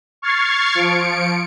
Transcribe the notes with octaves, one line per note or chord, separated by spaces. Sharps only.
C#6 F6 G#6 A6 C7
F3 C#7 D7